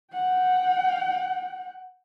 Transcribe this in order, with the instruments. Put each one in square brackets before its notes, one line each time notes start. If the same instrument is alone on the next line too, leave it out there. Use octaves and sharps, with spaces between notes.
[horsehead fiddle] F#5 G5